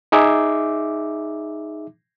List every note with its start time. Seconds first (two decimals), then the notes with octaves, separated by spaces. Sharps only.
0.12 D#4 G#4 E5 D6